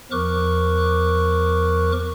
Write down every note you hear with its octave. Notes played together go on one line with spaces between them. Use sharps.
E2 F3 A#4 C#6 D6 F#6